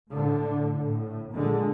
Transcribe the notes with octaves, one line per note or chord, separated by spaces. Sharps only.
A2 D3
A2
A#2 D3 G#3